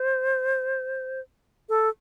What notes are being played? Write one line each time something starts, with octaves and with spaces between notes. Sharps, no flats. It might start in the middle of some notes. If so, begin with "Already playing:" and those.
Already playing: C5
A4